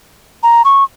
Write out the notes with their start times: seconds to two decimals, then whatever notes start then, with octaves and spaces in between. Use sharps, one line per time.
0.43 A#5
0.65 C#6